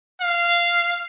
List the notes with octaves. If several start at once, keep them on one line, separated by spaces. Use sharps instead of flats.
F5